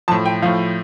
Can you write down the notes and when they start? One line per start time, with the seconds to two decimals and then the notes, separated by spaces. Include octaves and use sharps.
0.08 A2 F3 A5
0.26 G5
0.42 A2 F3 F5